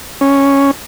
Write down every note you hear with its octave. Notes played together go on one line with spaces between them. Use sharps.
C#4